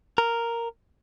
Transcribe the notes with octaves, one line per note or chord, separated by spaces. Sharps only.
A#4